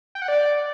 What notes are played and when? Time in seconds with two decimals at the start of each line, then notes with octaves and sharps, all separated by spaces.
0.15 G5
0.22 F#5
0.28 D5